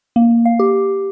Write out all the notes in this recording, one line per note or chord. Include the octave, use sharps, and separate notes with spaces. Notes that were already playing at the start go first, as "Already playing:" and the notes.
A#3
F5
G4